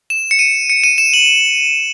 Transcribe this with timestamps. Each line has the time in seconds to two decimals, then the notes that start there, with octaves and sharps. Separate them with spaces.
0.10 E7
0.31 C#7
0.39 D#7
0.70 C#7
0.84 D#7
0.98 E7
1.13 F#7